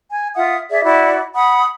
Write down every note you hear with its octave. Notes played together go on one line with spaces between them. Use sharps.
G#5
F4 E5 F#5 D#6
G#4 D5 E5
E4 F#4 D5
F#5 B5 D#6